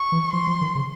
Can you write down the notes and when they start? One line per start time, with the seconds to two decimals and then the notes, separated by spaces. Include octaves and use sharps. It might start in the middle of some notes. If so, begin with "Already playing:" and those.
Already playing: C#6
0.12 E3
0.33 F3 C6
0.47 F3
0.61 D#3
0.75 C#3